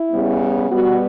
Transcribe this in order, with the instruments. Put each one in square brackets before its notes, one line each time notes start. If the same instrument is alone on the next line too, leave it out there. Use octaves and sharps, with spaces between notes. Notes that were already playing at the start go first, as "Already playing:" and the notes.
Already playing: [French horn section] E4
C#3 G3 B3
B2 G3 B3 F#4